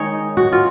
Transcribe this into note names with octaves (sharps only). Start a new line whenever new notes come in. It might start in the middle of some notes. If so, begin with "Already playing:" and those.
Already playing: D#3 G#3 D#4 C#5 D#5
F#4
F4